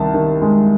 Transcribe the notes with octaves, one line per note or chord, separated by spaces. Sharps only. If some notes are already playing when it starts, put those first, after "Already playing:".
Already playing: C2 D#3 A5
D#3
G#3